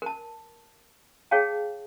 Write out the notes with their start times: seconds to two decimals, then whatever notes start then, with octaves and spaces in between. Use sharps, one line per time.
0.02 A#4 A5
1.31 G#4 C#5 F5 G5 A5